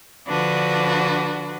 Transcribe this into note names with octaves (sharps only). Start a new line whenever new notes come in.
D3 F3 D4 F#4 B4